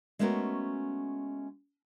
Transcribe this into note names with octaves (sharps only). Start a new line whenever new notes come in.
G#3 A3 B3 C#4 F#4 A#4